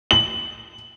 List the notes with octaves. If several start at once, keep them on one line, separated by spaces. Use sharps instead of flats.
F#7